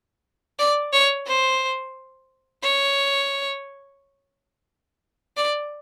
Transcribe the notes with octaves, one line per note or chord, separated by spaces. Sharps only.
D5
C#5
C5
C#5
D5